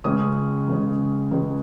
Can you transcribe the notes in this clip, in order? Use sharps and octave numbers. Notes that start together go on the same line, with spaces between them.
C#2 C#3 G#3 C#4 D#6
C#2 C#3 G#3 C#4
C#2 C#3 G#3 C#4 D#5